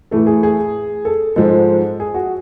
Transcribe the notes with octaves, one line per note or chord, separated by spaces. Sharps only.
A2 E3 A3 A4
G#4
G#4
A4
G#2 F3 G#3 A4
G#4
F#4